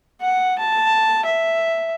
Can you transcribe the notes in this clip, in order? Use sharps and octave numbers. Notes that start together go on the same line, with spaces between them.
F#5
A5
E5